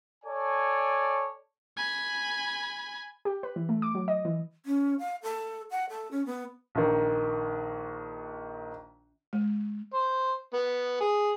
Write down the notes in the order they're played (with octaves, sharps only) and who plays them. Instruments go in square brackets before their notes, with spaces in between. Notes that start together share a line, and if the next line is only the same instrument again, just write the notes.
[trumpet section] A4 C#5 D5 G#5
[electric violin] G#5 B5
[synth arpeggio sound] G4
B4
E3
A3
D6
F#3
D#5
E3
[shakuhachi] C#4
F5
A4
F#5
A4
C#4
B3
[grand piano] A#1 D#3
[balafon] G#3
[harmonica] C5
B3
G#4